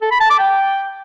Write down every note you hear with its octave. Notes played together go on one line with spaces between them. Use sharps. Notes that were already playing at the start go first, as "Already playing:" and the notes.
A4
B5
A5
D6
G5